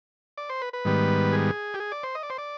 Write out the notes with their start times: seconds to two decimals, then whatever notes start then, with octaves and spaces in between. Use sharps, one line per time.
0.38 D5
0.49 C5
0.62 B4
0.73 B4
0.85 G#2 D#3 G3 B3
1.32 G#4
1.74 G4
1.80 G#4
1.92 D5
2.03 C5
2.15 D#5
2.23 D5
2.30 C5
2.38 D5